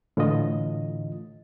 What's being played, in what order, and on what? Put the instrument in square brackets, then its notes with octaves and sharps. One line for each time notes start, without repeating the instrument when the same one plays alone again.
[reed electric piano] A2 D3 E3 F4 D#5